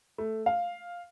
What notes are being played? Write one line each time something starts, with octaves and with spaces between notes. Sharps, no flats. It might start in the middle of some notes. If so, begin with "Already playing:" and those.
A3
F5